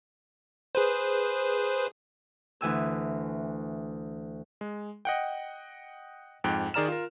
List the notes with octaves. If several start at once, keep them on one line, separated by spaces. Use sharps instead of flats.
G#4 B4 C5
D2 E3 G#5 E6
G#3
D#5 F#5 G5
F2 G#2 G5 F#6
D#3 G#4 D5 A#5 F6 E7
F4 A#4